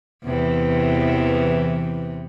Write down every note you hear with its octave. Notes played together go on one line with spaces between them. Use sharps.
E2 C3 E3